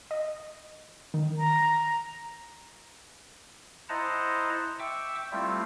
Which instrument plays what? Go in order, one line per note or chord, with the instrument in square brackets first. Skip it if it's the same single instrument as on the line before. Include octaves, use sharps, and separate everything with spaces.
[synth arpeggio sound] D#5
D#3
[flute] A#5
[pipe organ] E4 C5 D#5 F#5 A5 A#5
E5 G5 C#6 D6 E6
G3 A3 C4 E4 F4